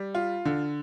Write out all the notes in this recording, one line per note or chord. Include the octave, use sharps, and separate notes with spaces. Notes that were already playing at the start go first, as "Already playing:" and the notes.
Already playing: G3
F4
D3